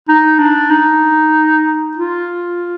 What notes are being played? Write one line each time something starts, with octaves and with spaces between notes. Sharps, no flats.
D#4
D4
D#4
F4